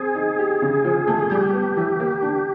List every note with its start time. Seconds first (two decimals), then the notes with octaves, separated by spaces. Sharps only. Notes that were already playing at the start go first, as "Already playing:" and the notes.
Already playing: C4 G#4
0.15 D#4
0.38 G4
0.62 C#3
0.85 F3
1.07 A3
1.30 G3 G4
1.53 B3
1.77 E3
2.00 A#3
2.22 D4